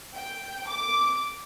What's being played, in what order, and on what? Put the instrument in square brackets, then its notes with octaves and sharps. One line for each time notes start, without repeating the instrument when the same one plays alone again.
[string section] G5
D6